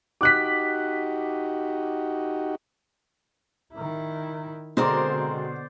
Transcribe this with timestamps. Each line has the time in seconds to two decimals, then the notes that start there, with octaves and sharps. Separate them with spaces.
0.21 D#4 F#4 G4 D6 F#6 B6
3.73 D#3 E4
4.77 B2 D3 G#3 C4 A#4 C5 D5 C6